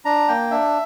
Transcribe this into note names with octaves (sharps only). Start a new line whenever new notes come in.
D4 A#5
A#3 G5
D4 E5